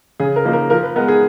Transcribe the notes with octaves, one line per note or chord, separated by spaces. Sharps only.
C#3 G#4
A#4
F3 A#3 D#4
A#4
F3 A#4
B4
G#3 B3 A#4
G#4